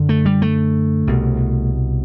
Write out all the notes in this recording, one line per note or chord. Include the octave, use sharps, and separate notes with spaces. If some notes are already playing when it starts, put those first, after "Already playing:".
Already playing: F#2 D3
A3
G3
A3
C2 B2